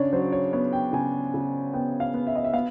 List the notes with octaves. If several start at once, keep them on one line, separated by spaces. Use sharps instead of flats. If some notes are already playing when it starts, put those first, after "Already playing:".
Already playing: C#3 D4 C#5 D5
F#3 C5
C#5
B3 C#5
G5
C#3 G#5
C#3
B3 G5
F5
B3
E5
D#5
E5
B3 F5